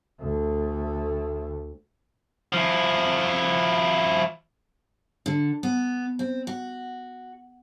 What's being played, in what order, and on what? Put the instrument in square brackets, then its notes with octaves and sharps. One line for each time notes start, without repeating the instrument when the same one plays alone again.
[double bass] D2 A3
[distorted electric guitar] F3 E4
[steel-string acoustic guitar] D3
B3
C4
F#4